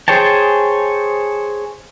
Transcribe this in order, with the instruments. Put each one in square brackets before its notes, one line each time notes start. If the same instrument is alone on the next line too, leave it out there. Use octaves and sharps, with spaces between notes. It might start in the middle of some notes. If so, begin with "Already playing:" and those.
[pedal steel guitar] G#4 C5 C#5 G5 A5